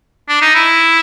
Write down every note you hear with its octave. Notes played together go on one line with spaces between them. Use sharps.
D4
D#4
E4